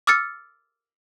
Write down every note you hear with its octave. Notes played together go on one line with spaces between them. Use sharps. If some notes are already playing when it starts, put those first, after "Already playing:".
D6 E6 F6 A6 C#7